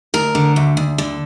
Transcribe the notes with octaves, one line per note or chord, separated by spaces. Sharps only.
D2 A#4
D3
D2
D2
D3